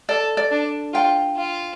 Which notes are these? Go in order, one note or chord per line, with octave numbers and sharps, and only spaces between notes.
A4 D5
D5
D4
F4 G5
F4